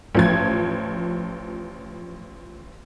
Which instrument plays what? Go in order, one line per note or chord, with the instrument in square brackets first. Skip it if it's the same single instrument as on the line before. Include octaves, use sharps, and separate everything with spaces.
[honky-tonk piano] A1 F3 G#6